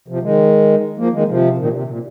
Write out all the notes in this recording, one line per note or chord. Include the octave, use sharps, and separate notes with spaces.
C3 F3
D#3 G#3
F3 A#3
D#3 G#3
C3 F3
A#2 D#3
C3
A#2